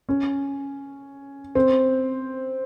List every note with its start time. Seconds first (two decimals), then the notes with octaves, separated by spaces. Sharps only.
0.09 C#4
1.55 C4